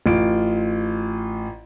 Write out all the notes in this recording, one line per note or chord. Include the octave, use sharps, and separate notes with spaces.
A1 F4 D7